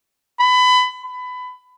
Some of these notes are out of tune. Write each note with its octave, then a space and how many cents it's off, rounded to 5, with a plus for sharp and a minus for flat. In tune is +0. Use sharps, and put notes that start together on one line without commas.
B5 +25
B5 +20